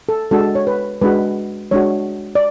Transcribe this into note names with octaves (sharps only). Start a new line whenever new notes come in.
A4
G#3 D4 F#4 A4
C#5
B4
G#3 D4 F#4 B4
G#3 D4 F#4 C#5
D5